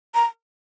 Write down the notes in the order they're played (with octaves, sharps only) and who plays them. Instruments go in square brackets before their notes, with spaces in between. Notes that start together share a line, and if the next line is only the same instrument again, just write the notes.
[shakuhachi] A#5